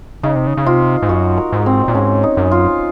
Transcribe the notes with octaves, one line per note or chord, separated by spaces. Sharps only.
C#3 D#4
C3
C#3
C#3
C3 F4
G#2
F#2 F#4
A#4
G#2
C4
A#2
G#2 C#4
D#4
F#2
F4